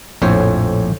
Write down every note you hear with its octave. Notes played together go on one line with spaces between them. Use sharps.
A#1 F2 A2 C5 C#5